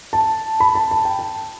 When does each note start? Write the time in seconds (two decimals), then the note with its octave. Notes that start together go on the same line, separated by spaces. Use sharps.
0.13 A5
0.60 B5
0.75 A5
0.91 A5
1.05 G5
1.19 A5